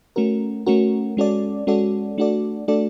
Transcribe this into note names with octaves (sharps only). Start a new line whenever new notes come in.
A3 C#4 F#4 A#4
A3 C#4 F#4 A#4
G#3 C#4 F#4 A4 D5
G#3 C#4 F#4 A4 D5
A3 D4 F#4 A4 D5
A3 D4 F#4 A4 D5